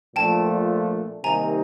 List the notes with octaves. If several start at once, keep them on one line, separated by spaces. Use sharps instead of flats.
A#2 F3 A3 D4 G5 A5
C3 D#3 G3 A#3 D#4 G#5 A#5